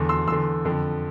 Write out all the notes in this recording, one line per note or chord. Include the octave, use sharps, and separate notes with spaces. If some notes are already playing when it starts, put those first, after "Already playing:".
Already playing: E2 D3
C6 E6
E2 D3 C6 E6
F2 D3